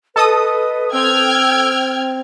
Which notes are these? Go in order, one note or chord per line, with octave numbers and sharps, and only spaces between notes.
A4 B4 D#5 D#6
C4 G5 E6 F6 G#6